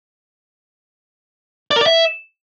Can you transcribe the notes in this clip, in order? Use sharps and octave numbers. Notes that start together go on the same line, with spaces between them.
D5
A#4
D5
E5